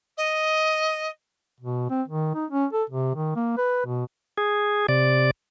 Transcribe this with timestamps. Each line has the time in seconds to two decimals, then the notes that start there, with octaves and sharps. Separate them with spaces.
0.17 D#5
1.60 B2
1.90 C4
2.08 D#3
2.35 D#4
2.50 C#4
2.73 A4
2.90 C3
3.15 D#3
3.36 A#3
3.57 B4
3.85 B2
4.38 G#4
4.89 C3 D5